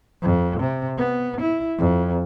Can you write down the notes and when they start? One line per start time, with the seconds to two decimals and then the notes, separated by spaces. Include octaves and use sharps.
0.23 F2
0.60 C3
0.98 B3
1.41 E4
1.79 F2